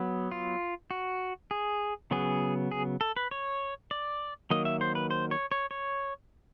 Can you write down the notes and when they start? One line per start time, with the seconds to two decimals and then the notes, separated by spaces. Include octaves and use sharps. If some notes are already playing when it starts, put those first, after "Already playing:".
Already playing: F#3 B3
0.31 F4
0.91 F#4
1.51 G#4
2.11 C#3 F#3 B3 G#4
2.71 G#4
3.01 A4
3.16 B4
3.31 C#5
3.91 D5
4.51 D#3 F#3 A#3 D#5
4.65 E5
4.81 C5
4.95 B4
5.11 C5
5.31 C#5
5.52 C#5
5.71 C#5